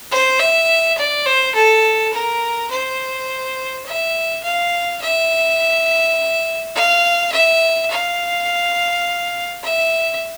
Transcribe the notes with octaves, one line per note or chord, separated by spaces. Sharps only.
C5
E5
D5
C5
A4
A#4
C5
E5
F5
E5
F5
E5
F5
E5